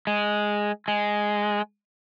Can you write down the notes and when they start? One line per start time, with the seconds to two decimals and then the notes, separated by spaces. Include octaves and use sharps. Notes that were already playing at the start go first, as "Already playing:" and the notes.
0.07 G#3
0.88 G#3